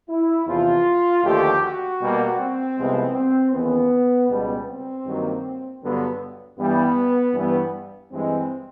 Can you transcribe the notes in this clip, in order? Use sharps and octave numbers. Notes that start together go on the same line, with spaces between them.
E4
E2 C3 F3 F4
D#2 D3 F3 A3 G4
F#4
B2 G3 A#3
C4
C2 C3 F3 G#3 B3
C4
D#2 C#3 E3 B3
C#2 B2 G3 B3
C4
G2 D#3 F#3 A#3
G2 D3 F#3 B3
G2 E3 G3 B3
G2 E3 G3 B3
G2 E3 G#3 C4